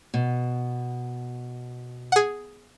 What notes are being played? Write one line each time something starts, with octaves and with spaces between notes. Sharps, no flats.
B2
G#4 F#5